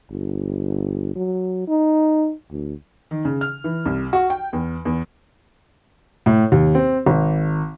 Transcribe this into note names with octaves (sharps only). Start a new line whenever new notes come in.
G1
F#3
D#4
D2
D#3
C#3
F6
E3
C2
F#4
G5
E2
E2
A2
D#2
C4
G#1